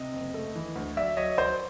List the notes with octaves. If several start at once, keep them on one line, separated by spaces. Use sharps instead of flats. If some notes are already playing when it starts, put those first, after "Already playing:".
Already playing: C3 D#5
F#1
A3
E3
D2
F#3 D5 E5
F#3 C#5 D#5
F#3 C5 D5